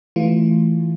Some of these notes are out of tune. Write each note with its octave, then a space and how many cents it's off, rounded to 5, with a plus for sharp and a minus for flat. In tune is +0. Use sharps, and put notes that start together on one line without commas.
E3 +0 A3 +0 F4 +0